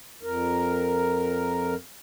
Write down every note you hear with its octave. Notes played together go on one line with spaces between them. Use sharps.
F2 A#4